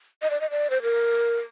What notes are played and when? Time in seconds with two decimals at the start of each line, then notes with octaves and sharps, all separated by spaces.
0.22 D#5
0.30 D5
0.41 D#5
0.50 D5
0.70 C5
0.82 A#4